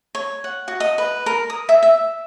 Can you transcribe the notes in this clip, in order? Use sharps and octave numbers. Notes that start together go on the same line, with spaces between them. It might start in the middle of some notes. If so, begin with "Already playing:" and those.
C#5
F#5
F#4
D#5
B4
A#4
D#6
E5
E5